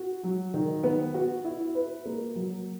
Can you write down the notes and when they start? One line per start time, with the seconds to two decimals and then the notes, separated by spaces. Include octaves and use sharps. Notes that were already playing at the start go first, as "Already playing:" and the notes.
Already playing: F#4
0.23 F#3
0.54 D#3
0.83 B3
1.14 F#4
1.44 E4
1.75 B4
2.05 A#3
2.35 F#3